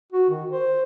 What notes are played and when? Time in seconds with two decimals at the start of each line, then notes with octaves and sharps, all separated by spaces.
0.12 F#4
0.30 D#3
0.50 C5